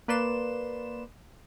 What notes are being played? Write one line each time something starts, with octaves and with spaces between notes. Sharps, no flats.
A#3 B4 D5 C6 E7